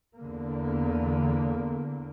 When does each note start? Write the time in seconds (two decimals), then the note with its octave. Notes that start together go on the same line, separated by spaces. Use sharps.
0.19 E2 D3 A#3